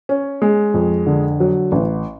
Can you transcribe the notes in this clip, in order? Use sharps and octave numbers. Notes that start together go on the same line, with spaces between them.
C#4
G#3
F2
D3
F#3
A1